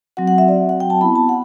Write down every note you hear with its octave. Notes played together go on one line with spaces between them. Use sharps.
F#3 C4 F#4 F#5
F#5
E5
D5
F#5
G5
A5
B3 E4 B5
A5
F#5